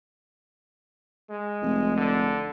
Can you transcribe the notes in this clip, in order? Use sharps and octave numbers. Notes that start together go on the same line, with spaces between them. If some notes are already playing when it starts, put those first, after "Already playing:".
G#3
F1
D3